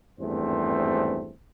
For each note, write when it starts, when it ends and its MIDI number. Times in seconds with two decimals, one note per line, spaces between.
0.20 1.33 32
0.20 1.33 40
0.20 1.33 43
0.20 1.33 57
0.20 1.33 60
0.20 1.33 72